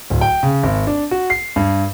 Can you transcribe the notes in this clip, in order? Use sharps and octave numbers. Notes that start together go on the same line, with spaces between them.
D1
G5
C#3
G#1
D4
F#4
C7
G2